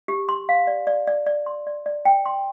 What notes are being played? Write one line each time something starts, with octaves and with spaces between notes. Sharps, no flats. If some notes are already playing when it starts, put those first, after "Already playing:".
G4
C6
F5
D5
D5
D5
D5
C6
D5
D5
G5
C6